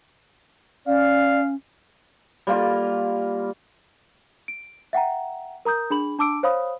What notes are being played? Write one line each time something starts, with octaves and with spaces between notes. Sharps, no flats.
C#4 D5 F5
G3 A#3 F4
D7
E5 F#5 G5 A#5
A#4 A#5 D#6 G6
D4 G#4 B5 F#7
D4 A5 D6 E6 D7
C5 C#5 F5 B5 D#6